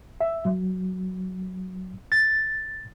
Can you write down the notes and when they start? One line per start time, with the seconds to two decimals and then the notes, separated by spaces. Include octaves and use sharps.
0.21 E5
0.45 F#3
2.12 A6